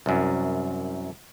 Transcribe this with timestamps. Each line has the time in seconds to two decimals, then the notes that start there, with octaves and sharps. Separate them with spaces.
0.06 C2 F#2